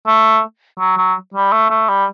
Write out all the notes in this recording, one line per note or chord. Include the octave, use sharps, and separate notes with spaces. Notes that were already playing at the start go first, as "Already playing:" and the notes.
A3
F#3
F#3
G3
A3
A3
G3